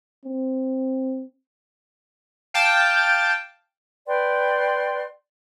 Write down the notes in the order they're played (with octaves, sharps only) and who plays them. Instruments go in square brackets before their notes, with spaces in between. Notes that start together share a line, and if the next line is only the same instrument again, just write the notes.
[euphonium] C4
[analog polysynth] F5 G5 A5 D6
[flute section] B4 D5 G5 C6